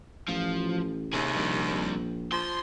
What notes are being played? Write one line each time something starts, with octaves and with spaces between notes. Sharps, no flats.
A1 F3
D#2 C3 G#4
A#1 C3 G3
F3 C6